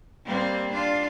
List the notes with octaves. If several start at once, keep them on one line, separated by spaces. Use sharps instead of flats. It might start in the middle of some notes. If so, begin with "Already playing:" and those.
G3 A#3 C4
D4 F4